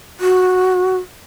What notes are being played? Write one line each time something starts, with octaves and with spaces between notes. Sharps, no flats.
F#4